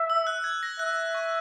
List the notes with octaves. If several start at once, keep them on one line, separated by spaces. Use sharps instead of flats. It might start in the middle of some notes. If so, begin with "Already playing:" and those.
Already playing: E5
E6
F#6
G#6
A#6
E5 F#6
C#6